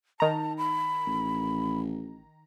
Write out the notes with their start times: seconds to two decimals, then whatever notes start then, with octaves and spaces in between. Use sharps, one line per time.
0.20 D#3 A5 A#5
0.58 B5
1.07 A1